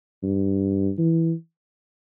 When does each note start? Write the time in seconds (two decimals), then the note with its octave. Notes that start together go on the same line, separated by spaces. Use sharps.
0.23 G2
0.98 E3